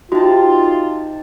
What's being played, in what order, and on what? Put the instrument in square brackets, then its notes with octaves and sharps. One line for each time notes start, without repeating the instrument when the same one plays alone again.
[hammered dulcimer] C3 A5 [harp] D#4 [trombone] F4 [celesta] F#4